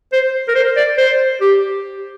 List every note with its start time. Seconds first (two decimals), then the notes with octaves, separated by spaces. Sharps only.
0.13 C5
0.48 A#4
0.55 C5
0.77 D5
0.98 C5
1.41 G4